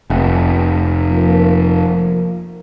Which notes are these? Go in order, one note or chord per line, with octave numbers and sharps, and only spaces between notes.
F1
F3 A#3